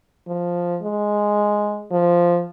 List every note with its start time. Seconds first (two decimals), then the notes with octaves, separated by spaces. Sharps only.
0.28 F3
0.83 G#3
1.92 F3